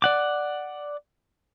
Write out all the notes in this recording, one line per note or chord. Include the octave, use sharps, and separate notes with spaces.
D5 F#5 D6